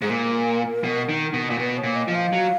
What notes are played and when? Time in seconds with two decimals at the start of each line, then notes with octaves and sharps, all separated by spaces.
0.02 G#2 G#4
0.10 A#2 A#4
0.84 B2
1.09 D#3
1.33 B2
1.50 A#2
1.59 B2 B4
1.78 C#5
1.84 A#2
1.95 D#5
2.08 F3
2.15 F5
2.33 F#3